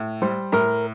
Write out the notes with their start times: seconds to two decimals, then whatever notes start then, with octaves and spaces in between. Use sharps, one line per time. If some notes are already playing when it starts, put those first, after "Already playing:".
Already playing: A2
0.22 G3 C5
0.52 A2 A#4